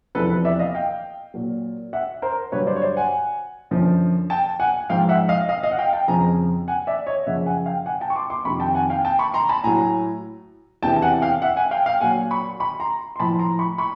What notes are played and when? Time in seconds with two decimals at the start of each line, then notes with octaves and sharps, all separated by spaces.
0.15 E2 C3 F3 A4 B4
0.30 A4 B4
0.45 D5 E5
0.59 D#5 F5
0.75 F5 G5
1.34 A#2 F#3
1.93 E5 F#5
2.22 A#4 C5
2.52 G2 D3 F#3 B4 C#5
2.67 C5 D5
2.76 C#5
2.82 C5 D5
2.97 F#5 G#5
3.71 F#2 D3 F3
4.30 G5 A5
4.60 F#5 G#5
4.90 G#2 F3 F5 G5
5.09 E5 F#5
5.29 D#5 F5
5.49 D#5 F5
5.63 D#5 F5
5.71 F#5
5.78 F5 G5
5.93 G5 A5
6.08 F2 C#3 F3 G#5 A#5
6.68 F#5 G#5
6.87 D5 E5
7.06 C#5 D#5
7.26 F#2 C#3 F3 E5 F#5
7.46 F#5 G#5
7.66 F5 G5
7.86 F#5 G#5
8.01 G5 A5
8.10 C#6
8.15 C6 D6
8.30 C6 D6
8.45 F2 C3 D#3 B5 C#6
8.60 G5 A5
8.75 F#5 G#5
8.90 F5 G5
9.05 G5 A5
9.19 B5 C#6
9.34 A#5 C6
9.49 A5 B5
9.64 A2 F#3 G#5 A#5
10.82 E2 C3 E3 G5 A5
10.96 A5
11.02 F#5 G#5
11.22 F5 G5
11.42 E5 F#5
11.56 F#5 G#5
11.71 F5 G5
11.86 F5 G5
12.01 A#2 F#3 F#5 G#5
12.31 B5 C#6
12.60 B5 C#6
12.80 A#5 C6
13.16 C6
13.20 A2 F3 A5 B5
13.39 A#5 C6
13.59 B5 C#6
13.78 B5 C#6